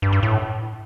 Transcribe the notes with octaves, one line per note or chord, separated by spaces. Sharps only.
G2
G2
A2